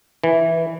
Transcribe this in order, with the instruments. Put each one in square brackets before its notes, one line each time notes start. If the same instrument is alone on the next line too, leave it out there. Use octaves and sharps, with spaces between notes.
[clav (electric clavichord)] E3